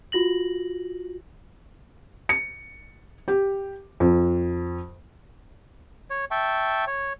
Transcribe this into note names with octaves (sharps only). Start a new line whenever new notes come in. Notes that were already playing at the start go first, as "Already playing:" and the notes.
F4 F#4 A#6 F#7
C#7
G4
F2
C#5
E5 G5 A5 C#6
C#5